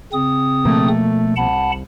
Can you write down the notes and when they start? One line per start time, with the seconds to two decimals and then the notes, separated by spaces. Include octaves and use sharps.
0.13 C#3 C4 D#6
0.65 B2 F3 A3 A#3
1.37 C2 F#5 A5 B5